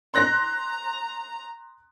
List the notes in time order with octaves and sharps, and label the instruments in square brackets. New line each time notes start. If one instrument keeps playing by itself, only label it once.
[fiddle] A#5 [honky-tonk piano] C6 F#6 A#6